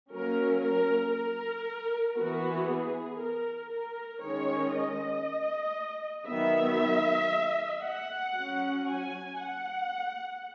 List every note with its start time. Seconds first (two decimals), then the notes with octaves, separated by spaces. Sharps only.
0.11 F#3 A#3 C#4 A#4
0.62 A#4
1.14 A#4
2.17 E3 B3 F#4
2.68 G#4
3.21 A#4
3.72 A#4
4.23 D#3 G#3 C#4 C#5
4.75 D#5
6.29 D#3 F#3 B3 E5
7.84 F#5
8.35 F#3 C#4
8.87 G#5
9.38 F#5